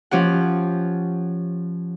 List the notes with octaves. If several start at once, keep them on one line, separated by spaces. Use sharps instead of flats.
F3 C#4 G4 F#5